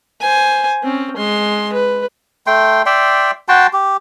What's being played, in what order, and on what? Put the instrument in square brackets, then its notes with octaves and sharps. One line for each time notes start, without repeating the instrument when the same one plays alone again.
[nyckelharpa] C5 G#5
C4 C#4
G#3 C6
B4
[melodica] A3 G5 C6
D5 E5 G5 C6
F#4 G5 A5 C6
G4